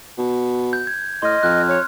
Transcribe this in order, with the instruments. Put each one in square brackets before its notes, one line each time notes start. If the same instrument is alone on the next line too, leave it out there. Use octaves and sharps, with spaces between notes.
[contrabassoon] B2
[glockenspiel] G6
G#6
[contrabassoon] A2 [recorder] D#5 [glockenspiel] C6 F6
[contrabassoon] F2 [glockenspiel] F6 F#6
[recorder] C#5